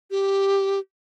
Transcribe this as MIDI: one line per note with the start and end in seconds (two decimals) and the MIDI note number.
0.11 0.79 67